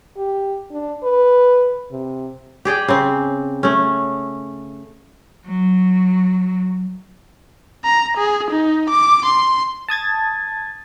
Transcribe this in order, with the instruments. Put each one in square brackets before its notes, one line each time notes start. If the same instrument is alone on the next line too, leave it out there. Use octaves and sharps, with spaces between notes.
[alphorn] G4
D4
B4
C3
[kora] G4 G#4 D5 G5
C#3 C4
A3 C#4
[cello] F#3
[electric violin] A#5
G#4
D#4
D6
C6
[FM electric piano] A5 D#6 G#6 A6